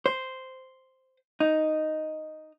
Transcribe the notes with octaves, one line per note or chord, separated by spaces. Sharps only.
C5
D#4